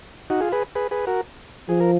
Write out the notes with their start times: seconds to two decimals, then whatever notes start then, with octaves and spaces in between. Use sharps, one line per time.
0.30 D#4 F#4
0.41 F4 G#4
0.52 G#4 B4
0.75 G#4 B4
0.91 G#4 B4
1.07 F#4 A#4
1.69 F3 G#4
1.80 A#4